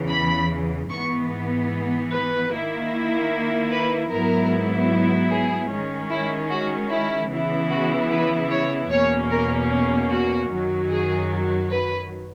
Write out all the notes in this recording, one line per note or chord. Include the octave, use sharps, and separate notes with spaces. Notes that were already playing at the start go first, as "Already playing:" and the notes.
Already playing: E2 C#3 E3
B5
G#2 E3 B3 C#6
B4
D#3 A#3 E4
B4
G#2 F#3 B3 E4 A#4
G#4
D#3 G#3 C#4
E4
F#4
E4
C#3 E3 B3 E4
F#4
B4
C#5
E2 B2 A#3 C#4 C#5
A#4
F#4
F#2 D#3 F#3
G#4
B4